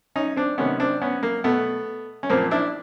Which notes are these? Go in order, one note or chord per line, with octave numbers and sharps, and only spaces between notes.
C#4 D#4
C4 D4
C3 D#3 B3 C#4
C4 D4
B3 C#4
A#3
B2 A3 B3
C#4
A#2 F3 A#3 C4
D4 E4